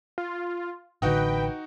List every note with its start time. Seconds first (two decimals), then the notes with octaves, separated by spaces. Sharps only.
0.18 F4
1.02 A1 D3 D#4 F#4 B4 G5